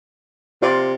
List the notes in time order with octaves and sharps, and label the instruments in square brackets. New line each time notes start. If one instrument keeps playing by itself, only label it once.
[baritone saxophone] C3 [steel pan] F4 D5